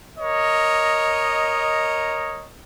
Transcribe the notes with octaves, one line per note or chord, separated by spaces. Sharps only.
A#4 C#5 D#5